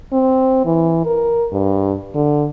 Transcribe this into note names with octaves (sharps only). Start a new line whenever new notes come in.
C4
E3
A#4
G2
D3